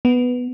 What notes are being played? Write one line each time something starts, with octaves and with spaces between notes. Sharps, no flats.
B3